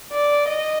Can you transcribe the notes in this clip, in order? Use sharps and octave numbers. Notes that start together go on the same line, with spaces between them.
D5
D#5